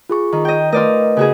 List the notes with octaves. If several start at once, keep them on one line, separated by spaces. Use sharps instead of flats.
F4 G#4 C#6
D#3
D#5 G5
A3 F4 A#4 B4 D5 D#5
C#3 F#4 G#4